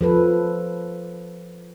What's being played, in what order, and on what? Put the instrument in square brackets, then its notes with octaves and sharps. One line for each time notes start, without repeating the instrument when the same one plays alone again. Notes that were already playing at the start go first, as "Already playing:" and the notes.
[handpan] F3 A4 B4